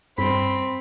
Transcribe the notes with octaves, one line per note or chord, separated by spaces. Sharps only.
G2 C4 B5